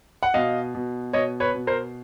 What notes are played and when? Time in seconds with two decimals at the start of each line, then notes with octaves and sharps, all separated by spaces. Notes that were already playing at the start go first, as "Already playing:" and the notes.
0.23 F#5
0.34 B2 D#5 F5
0.75 B2
1.13 B2 C#5 D#5
1.40 B4 C#5
1.54 B2
1.67 A#4 C5